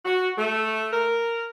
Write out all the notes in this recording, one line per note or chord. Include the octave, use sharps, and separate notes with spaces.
F#4
A3
A#4